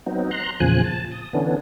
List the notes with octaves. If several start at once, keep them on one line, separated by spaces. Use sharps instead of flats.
F#3 B3 C4 D#4
A#5 C6 F#6
E2 A#2 C#3 F3 G#5 F#6
A5
D#6
D3 E3 B3 C#4 D4